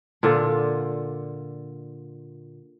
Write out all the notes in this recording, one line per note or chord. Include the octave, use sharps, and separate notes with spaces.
A#2 D3 F4